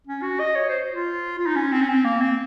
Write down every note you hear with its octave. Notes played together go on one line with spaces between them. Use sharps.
C#4
F#4
D#5
C#5
C5
F4
F4
D#4
C#4
C4
C#4
C4
A#3
C4